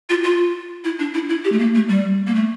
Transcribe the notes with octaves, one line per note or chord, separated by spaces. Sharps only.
F4
F4
E4
D4
E4
E4
G4
A3
A#3
A3
G3
A#3
A3